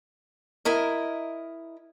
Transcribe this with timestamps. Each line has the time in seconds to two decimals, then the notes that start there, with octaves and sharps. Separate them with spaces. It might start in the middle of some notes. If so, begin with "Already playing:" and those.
0.65 E4 A#4 D#5